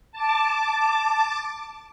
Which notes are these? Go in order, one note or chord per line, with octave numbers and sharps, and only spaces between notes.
A5 D6